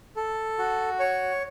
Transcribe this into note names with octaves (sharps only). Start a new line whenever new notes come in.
A4
F#4
C#5